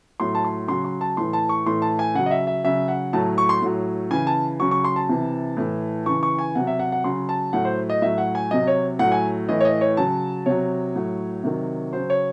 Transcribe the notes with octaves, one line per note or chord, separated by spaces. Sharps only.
A2 F#3 C6
A5
C6
C#3 F#3 C6
C6
A5
A2 E3 C6
A5
C#6
A2 E3 C6
A5
G#5
C#3 F#3 F#5
D#5
E5
E5
C#3 F#3 E5
F#5
A2 F#3 A5
C#6
C6
A2 F#3
C#3 E3 G#5
A5
C#3 F#3 C#6
C#6
C6
A5
C3 E3
A2 E3
C#3 E3 C#6
C#6
G#5
C3 F#3 F#5
E5
F#5
F#5
C#3 F#3 C6
A5
A2 F#3 F#5
C5
D#5
A2 F#3 E5
F#5
G#5
C3 F#3 D#5
C#5
A2 F#3 F#5
G#5
A2 E3 D#5
C#5
D#5
C#5
C#3 F#3 A5
C3 F#3 C#5
A2 F#3
C3 D#3 F#3
C#3 F#3 C5
C#5